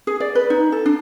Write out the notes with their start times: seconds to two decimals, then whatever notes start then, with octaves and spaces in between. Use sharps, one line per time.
0.07 G#4
0.20 D5
0.35 B4
0.50 D#4
0.72 A4
0.86 D4